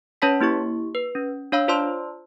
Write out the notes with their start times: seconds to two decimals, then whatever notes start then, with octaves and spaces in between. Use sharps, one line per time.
0.22 C#4 B4 C#5 A5 B5 B6
0.41 A#3 E4 G4 C#6
0.95 B4
1.15 C#4
1.52 D4 C#5 F5 B5 E6
1.68 F4 C5 D5 A5 C6 E6